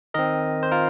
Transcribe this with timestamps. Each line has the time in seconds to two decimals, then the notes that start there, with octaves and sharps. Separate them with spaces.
0.14 D#3 C4 A#4 D#5
0.63 C5
0.72 F4 A#4